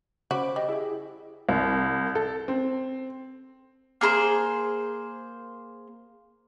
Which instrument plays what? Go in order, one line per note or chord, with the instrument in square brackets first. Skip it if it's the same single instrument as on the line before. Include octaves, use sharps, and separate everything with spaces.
[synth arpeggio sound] C#3 B5 D6 [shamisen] F#4 [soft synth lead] C5
[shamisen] G3 [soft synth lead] D#5
[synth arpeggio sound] E4 G4 [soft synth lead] G#4
[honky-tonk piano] C2
A4
C4
[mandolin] A#3 G#4 A#4 C5